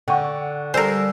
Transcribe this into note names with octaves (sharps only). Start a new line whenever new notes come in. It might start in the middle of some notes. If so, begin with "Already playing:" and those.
D3 F#5 G5 C#6
G3 A4 A#4 C5 G#5